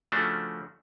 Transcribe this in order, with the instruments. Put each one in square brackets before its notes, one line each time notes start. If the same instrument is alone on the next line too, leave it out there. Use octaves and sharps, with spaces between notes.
[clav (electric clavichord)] C#3 F3 A3 C#4 D4 F#4